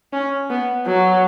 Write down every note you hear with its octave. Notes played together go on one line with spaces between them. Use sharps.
C#4
B3
F#3